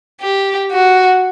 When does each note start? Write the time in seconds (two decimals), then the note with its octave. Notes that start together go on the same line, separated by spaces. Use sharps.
0.21 G4
0.71 F#4